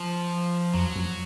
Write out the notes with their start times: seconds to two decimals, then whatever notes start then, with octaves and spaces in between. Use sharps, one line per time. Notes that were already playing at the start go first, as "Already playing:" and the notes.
Already playing: F3
0.74 F2 F#3
0.96 F2